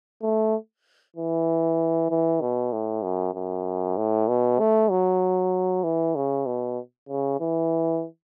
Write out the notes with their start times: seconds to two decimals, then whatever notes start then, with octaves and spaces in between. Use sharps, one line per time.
0.22 A3
1.16 E3
2.10 E3
2.41 B2
2.73 A2
3.03 F#2
3.34 F#2
3.97 A2
4.28 B2
4.59 A3
4.90 F#3
5.84 E3
6.15 C#3
6.46 B2
7.09 C#3
7.40 E3